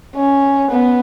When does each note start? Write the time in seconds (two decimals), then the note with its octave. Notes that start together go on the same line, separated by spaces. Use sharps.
0.15 C#4
0.71 B3